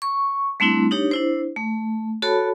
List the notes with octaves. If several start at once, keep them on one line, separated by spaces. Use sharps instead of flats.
C#6
G3 A3 C4 D4 E4
D4 D#4 G4 C#5
D4 E4 C5
A3
F#4 A4 C#5 A5 B5